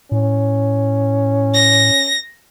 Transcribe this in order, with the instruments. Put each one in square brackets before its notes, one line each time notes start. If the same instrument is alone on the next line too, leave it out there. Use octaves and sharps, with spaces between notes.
[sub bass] A2 [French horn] C#4
[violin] A#6